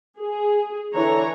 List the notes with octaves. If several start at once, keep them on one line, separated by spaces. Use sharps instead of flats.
G#4
D3 E3 C#5 A#5